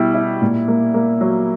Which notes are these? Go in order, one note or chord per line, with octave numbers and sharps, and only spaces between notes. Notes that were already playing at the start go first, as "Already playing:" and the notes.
Already playing: B2 G3 E4
E4
A#2
A#3
A#3
F#3